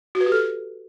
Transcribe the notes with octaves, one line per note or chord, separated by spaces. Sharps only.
F#4
B4
G4
A4